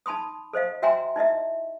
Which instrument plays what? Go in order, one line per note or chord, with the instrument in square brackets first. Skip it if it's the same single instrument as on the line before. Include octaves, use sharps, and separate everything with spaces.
[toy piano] D#4 A5 B5 C6 D#6
A4 C5 D#5 F5
F#4 E5 G5 G#5 A#5 C6
D#4 E4 D#5 E5